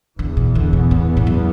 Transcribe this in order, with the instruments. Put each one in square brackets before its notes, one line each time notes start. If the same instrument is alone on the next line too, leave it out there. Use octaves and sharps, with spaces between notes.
[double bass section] E2 E3 B3 [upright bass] D3
[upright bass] B2
D3
B2
A2
A2
F#2